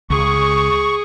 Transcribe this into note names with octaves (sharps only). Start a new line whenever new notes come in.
C#2 G#4 C#6